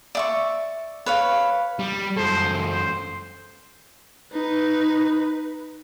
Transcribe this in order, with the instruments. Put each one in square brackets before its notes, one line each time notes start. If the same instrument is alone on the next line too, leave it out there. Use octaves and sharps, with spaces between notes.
[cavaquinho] D5 E5 C#6
B4 C#5 F5
[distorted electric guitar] G3
[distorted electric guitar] F#2 A4 [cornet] C5
[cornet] C5
[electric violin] D#4 B4